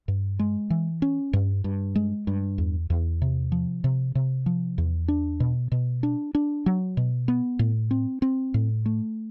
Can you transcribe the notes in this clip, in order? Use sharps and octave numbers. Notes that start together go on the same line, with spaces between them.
G2
G#3
E3
C#4
G2
G2
G#3
G2
E2
E2
C3
F3
C3
C3
F3
E2
D4
B2
B2
D4
D4
F#3
B2
B3
A2
C4
C4
A2
A3